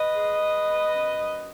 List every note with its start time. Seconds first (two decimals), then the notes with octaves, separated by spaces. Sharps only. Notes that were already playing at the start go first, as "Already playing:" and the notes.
Already playing: B4 D#5
0.13 G#3
0.39 G#3
0.65 B3
0.91 F#2
1.17 F#2